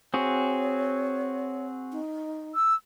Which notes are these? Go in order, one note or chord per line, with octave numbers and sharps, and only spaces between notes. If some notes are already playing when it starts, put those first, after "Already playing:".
C4 F#4 G#4 C#5
D#4
E6